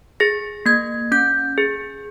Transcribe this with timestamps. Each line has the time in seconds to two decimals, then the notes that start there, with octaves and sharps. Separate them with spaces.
0.20 G#4 A#6
0.66 A#3 G#6
1.12 C#4 G6
1.58 G#4